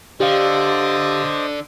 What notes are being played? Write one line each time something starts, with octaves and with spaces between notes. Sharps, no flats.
D3 G4 C5 D5 D#5 F5